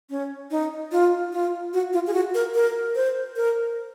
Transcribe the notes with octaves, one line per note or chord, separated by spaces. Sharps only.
C#4
D#4
F4
F4
F#4
F4
G#4
F#4
A#4
A#4
C5
A#4